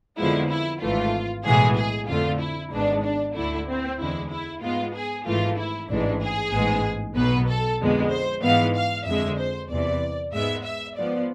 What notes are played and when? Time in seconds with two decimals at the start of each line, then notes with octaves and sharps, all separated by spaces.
0.18 F2 D3 F3 G#3 B3 E4
0.49 E4
0.81 G#1 G#2 E3 A3 F4
1.44 B1 A2 E3 G#3 B3 G#4
1.76 G#4
2.08 F2 D3 A3 F4
2.40 E4
2.72 G#1 G#2 G#3 B3 D4
3.03 D4
3.34 D2 D3 A3 E4
3.67 C4
3.98 E2 D3 G#3 E4
4.30 E4
4.62 G#2 G#3 B3 F4
4.93 G#4
5.25 G#1 G#2 E3 A3 F4
5.57 E4
5.89 A1 G#2 E3 G#3 D4
6.20 G#4
6.52 A1 G#2 G#3 B3
7.15 B1 B2 B3 B4
7.47 A4
7.80 F2 D3 G#3 B3
8.10 C5
8.42 G#2 E3 G#3 B3 F5
8.75 F5
9.06 F2 D3 G#3 E5
9.38 C5
9.69 E2 C3 E3 D5
10.33 G#2 G#3 B3 E5
10.64 E5
10.96 G#2 F3 B3 D5